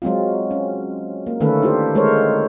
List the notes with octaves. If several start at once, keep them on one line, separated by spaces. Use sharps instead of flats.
F#3 G#3 C4 F4
C#4
A#3
D3 D#3 A3 C#4 A4 B4
D4 E4 F4 G4 C5
G#3 A3 A4 A#4 C5 C#5